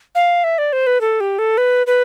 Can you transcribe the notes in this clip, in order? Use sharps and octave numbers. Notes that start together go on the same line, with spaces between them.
F5
E5
D5
C5
B4
A4
G4
A4
B4
B4